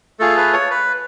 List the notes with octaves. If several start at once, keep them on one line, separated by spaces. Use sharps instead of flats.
A3 F4 G#4 A4
B4
C#5
B4